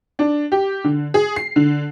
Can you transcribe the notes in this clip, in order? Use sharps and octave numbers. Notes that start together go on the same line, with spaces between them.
D4
G4
D3
G#4
C7
D3